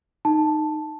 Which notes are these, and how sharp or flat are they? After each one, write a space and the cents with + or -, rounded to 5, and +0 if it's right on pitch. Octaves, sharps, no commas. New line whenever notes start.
D#4 -10 A5 +0